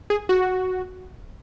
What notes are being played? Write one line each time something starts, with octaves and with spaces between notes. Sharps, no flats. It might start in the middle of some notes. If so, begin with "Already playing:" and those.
G#4
F#4